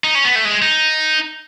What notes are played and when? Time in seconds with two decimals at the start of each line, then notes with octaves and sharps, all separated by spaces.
0.04 D#4
0.15 C#4
0.25 B3
0.35 A3
0.45 G#3
0.62 D#4